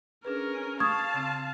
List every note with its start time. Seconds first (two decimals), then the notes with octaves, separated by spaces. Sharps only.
0.25 C#4 D4 G#4 A#4 B4
0.80 F5 A5 C#6 D#6 G#6
1.14 C#3 C4